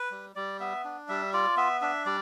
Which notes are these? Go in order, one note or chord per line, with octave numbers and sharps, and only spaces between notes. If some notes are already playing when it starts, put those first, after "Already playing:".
Already playing: B4
G3
G3 D5
B3 E5
D4
G3 E5
F4 D5
B3 E5
D4 E5
G3 D5